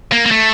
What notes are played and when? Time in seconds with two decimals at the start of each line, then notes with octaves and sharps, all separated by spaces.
0.12 A#3
0.26 A#3
0.31 A3